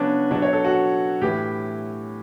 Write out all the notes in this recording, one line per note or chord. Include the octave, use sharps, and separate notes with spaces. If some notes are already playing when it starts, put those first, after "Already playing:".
Already playing: C#3 F#3 B3 C#4 D4
B2 F#3 D4
C#5
A4
F#4
A2 E3 G4